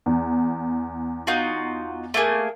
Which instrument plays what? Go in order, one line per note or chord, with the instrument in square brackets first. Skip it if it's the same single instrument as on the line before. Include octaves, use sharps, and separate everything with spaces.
[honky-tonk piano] E2
[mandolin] D#4 F4 F#4
A3 A#3 G#4